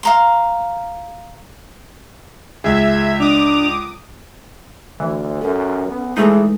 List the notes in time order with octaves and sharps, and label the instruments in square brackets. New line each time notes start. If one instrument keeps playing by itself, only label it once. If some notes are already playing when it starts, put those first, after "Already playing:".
[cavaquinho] F5 A#5 C6
[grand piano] C#2 [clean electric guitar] G#4 [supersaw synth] E5 [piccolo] G#6
[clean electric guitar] D4 [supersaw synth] D6 D#6 [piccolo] F7
[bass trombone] D2 [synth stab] E3
[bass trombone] F#2 [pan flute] C#4 [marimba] A4
[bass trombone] B3
[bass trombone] E3 [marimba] G#3 A4 G#5 [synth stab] A3 D#4 [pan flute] G#4